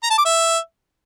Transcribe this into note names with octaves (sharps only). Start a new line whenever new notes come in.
A#5
A5
D6
E5